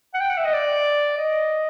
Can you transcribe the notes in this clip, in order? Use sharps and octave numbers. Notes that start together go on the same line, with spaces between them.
F#5
G5
F#5
E5
D#5
D5
D#5